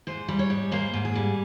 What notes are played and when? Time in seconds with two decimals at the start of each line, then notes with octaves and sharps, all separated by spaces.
0.07 G#2 C5
0.28 G3
0.39 C#5
0.50 G#2
0.72 A#3 C5
0.93 G#2
1.05 G#4
1.15 G3